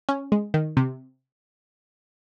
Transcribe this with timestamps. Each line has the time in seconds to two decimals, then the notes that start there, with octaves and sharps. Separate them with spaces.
0.09 C#4
0.32 G#3
0.54 D#3
0.77 C3